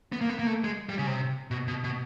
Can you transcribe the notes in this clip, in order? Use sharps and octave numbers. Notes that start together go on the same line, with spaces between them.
B3
A#3
B3
A#3
A3
G#3
G3
C#3
C3
B2
B2
B2